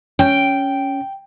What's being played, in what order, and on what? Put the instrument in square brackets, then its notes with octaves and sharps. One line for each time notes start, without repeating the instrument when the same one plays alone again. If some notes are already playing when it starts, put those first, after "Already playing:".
[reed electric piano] C#4 [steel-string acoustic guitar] G5